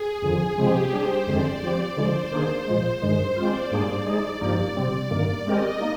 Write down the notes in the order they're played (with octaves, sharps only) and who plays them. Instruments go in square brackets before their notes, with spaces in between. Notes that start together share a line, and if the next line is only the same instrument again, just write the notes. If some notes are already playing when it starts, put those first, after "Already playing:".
Already playing: [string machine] G#4
[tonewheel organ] F2 D3 F3
[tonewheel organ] C3 F3 G#3 C4 [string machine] G4
[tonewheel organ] G3 D4 G#4 [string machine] C5
[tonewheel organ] F2 D3 G#3 C4 [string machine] D5
[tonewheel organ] F3 C4 G4
[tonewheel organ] D3 F3 G#3 [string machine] C5
[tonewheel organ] D#3 A#3 D4 G#4
A#2 F3 G#3
G2 D#3 G#3
[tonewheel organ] G#3 C4 F4 [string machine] D5
[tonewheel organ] G#2 G3 A#3 D4 G#4
[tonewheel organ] G#3 D#4 G#4 [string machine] D5
[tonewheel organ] G2 F3 A#3 D#4 G4
[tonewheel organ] C3 G3 C4 [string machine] D5
[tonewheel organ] G2 D#3 A#3
[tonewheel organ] G#3 C4 G4 A#4 [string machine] D#5
[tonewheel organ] A#3 D#4